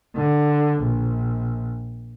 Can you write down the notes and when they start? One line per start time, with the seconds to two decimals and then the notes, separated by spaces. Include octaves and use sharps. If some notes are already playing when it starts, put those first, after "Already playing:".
0.16 D3
0.81 A#1